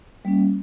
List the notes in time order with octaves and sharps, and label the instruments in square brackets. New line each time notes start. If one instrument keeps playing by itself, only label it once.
[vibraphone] G3 A#3 C#4